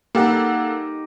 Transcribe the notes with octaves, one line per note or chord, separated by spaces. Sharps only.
A#3 D#4 G4 A4 F#5